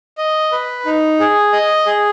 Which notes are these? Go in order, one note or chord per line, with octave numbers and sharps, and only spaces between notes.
D#5
B4
D#4
G#4
D#5
G#4